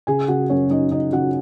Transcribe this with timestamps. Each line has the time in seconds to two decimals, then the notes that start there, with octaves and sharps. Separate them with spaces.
0.07 C#3 G#4 G#5
0.28 C#3 F#4 F#5
0.49 F#2 C#4 C#5
0.70 F#2 D#4 D#5
0.91 C#3 D#4 D#5
1.12 C#3 F#4 F#5